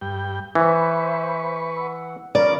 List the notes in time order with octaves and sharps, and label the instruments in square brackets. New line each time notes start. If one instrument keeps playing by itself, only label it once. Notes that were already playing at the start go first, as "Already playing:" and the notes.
[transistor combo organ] G2 G5
[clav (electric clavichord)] E3 [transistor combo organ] B4 C#6 [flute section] C5 E5
[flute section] F#5 E6
[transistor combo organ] C#3 F3 [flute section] A#4 A#5 B5 [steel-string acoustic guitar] D5